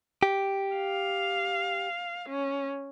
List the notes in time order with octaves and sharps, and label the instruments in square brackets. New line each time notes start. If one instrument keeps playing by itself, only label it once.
[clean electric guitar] G4
[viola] F5
C#4